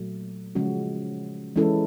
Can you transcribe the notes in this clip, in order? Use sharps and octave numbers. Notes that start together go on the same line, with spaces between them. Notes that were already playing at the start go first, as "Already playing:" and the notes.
Already playing: A#2 F#3 A3
C#3 F3 G#3 C#4 F#4
E3 G#3 C#4 E4 A4